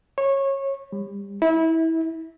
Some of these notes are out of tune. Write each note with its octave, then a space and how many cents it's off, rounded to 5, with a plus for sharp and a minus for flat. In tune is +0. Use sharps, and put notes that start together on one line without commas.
C#5 -20
G3 +30
E4 -25